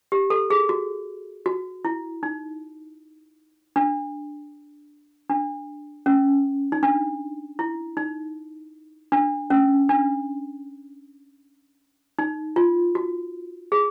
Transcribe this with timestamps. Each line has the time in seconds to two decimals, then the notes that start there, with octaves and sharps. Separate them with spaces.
0.12 G4
0.30 A4
0.50 G#4
0.69 F#4
1.46 F#4
1.85 E4
2.23 D#4
3.76 D4
5.30 D4
6.06 C#4
6.72 D#4
6.83 D4
7.59 E4
7.97 D#4
9.12 D4
9.50 C#4
9.89 D4
12.19 D#4
12.56 F4
12.95 F#4
13.72 G#4